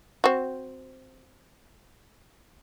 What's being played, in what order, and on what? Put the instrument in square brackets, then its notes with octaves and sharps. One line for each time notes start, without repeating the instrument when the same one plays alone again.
[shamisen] C4 F#4